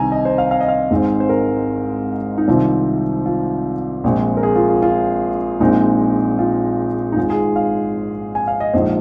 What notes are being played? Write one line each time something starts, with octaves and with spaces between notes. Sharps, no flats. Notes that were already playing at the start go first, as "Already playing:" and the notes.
Already playing: C2 C3 D#3 C4 G#5 A#5
D#5
C5
F5
F5
D#5
F5
G#1 G#2 G#3 C4
C5
A#4
D#4
C2 C3 D#3 C4 F4
F4
A#1 A#2 G#3 C4
A#4
G#4
F4
F4
F4
A#1 A#2 G#3 C4 D#4
F4
D#4
G#1 G#2 G#3 F4
G#4
F5
G#5
F5
D#5
A#1 G#2 F3 C5